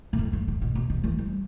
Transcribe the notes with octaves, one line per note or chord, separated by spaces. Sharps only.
B2
A2
G2
A2
B2
B2
C3
E3
G3